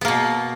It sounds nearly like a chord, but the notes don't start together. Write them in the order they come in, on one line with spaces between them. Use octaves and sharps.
B3 A#3 B2